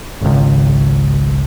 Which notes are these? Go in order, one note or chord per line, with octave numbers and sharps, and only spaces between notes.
G#1 C#2